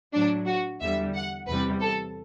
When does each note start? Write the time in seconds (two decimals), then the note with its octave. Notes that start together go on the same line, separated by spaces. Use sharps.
0.13 A2 F#3 D4
0.46 F#4
0.80 E2 D3 G3 E5
1.14 F#5
1.47 E2 C3 G3 B4
1.81 A4